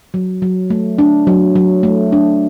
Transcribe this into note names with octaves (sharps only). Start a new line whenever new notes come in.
F#3
F#3
A3
D4
F#3
F#3
A3
D4